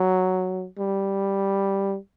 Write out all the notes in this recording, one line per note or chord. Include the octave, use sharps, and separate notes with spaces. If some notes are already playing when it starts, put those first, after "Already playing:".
Already playing: F#3
G3